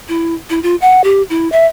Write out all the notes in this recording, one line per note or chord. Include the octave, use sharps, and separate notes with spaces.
E4
E4
F4
F#5
G4
E4
E5